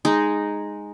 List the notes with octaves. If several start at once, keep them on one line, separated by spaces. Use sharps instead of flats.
G#3 D#4